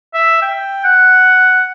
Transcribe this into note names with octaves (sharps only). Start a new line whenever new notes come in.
E5
G5
F#5